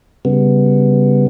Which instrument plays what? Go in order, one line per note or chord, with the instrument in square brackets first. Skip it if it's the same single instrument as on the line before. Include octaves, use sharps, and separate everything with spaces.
[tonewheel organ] C#3 G3 B3